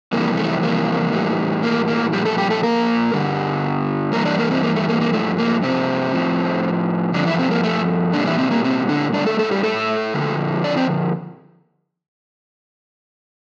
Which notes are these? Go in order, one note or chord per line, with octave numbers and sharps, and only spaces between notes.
F2 C3 E3 G3 A#3
A3
A#3
A2 E3 G3
A#3
A#3
A#2 F3 G3 G4
A3 A4
G3 G4
A3 A4
A#3 A#4
G2 D3 G3
G2 E3 G3 A#3 A#4
D4 D5
A#3 A#4
C3 C4
A#3
A3
A#3
A#3
G2 F3 A3
A#3
C3 C4
A2 F3
G2 D3 F3 D4
E3 E4
C3 C4
A#3
A3
A#2 D3 G3 D4
E3 E4
C3 C4
A#3
C3 C4
D3 D4
A2 D3 G3 D4
A3 A4
A3 A4
G3 G4
A3 A4
F2 D3 F3
D4 D5
C4 C5